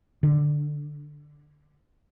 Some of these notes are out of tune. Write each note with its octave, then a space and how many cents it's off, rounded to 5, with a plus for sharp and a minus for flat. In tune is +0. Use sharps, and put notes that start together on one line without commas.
D3 +5